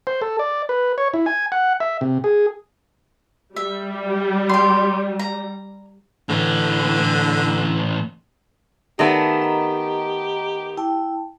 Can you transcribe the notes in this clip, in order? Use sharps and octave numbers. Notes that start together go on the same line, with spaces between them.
C5
A4
D5
B4
C#5
E4
G#5
F#5
E5
C3
G#4
G3 E5
G4 C6
A#5
A2 D3 E3
D#3 A3 B3 G4 D5 E5
D#5 A#5
E4 G5 A5